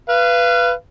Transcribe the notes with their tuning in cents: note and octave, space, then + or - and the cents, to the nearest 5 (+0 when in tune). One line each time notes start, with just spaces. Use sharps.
B4 +0 F5 -30